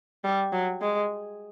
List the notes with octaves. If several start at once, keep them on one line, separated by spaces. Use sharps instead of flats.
G3
F#3
G#3